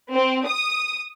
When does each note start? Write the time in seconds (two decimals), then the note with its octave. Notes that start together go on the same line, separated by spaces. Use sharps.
0.12 C4
0.46 D#6